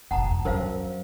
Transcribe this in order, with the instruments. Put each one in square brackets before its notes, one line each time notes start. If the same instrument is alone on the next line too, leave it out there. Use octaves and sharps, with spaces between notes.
[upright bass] F1 A#1 [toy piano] F#5 A5 A#5
[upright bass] F2
[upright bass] F#3 C#4 [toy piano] A#4 C5 F5